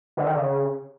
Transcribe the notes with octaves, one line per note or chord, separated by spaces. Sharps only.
D3
D#3
C#3